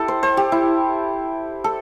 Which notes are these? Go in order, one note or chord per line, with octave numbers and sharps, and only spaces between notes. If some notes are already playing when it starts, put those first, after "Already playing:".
Already playing: E4 G4 A4
C5
C5
G4
E4
A4